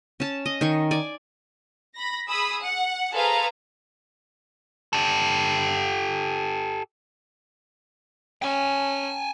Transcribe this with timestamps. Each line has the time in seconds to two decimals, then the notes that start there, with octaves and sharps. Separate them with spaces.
0.20 C#4 A5
0.46 D#5
0.61 D#3 G#5 C#6
0.91 D5 G#5
1.95 B5 A#6
2.28 G#4 B5 D#6 E6
2.61 F#5
3.14 G#4 A4 B4 C5 F5 A#5
4.93 G4 A4
8.42 C#4 G5 G#5